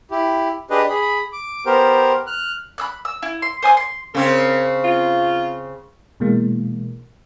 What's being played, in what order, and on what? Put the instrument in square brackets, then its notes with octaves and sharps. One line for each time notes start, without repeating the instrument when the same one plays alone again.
[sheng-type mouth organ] E4 G4
D4 G4 G#4 B4 D#5
G#4 B5
D6
B3 G4 A#4 C5
F6 F#6
[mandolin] B5 E6 F#6
E6
E4
C6
C5 G#5 D#6 F#6
C6
[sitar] C#3 C4 [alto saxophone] A#4
[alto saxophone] F4
[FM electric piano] B2 E3 G#3 A#3